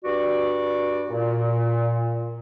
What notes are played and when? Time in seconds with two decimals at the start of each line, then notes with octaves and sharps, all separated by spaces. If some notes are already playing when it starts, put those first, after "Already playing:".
0.05 G2 F#4 D5
1.10 A#2